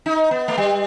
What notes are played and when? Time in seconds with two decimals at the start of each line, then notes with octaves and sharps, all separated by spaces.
0.06 D#4
0.31 B3
0.48 A3
0.58 G3